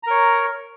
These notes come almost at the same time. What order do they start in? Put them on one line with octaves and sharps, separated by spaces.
A#5 A#4 C#5